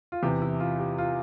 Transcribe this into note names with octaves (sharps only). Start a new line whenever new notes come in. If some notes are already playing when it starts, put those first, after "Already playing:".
F4
E2 C3 E3 G4
E4
F4
G4
F4